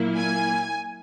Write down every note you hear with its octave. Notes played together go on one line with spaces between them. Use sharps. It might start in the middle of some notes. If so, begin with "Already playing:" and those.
Already playing: A#2 F#3 A#3 E4
G#5